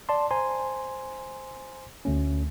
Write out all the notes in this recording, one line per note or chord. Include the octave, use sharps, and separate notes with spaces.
D5 A5 C6
C5 G#5 A#5 C6
D2 A3 C#4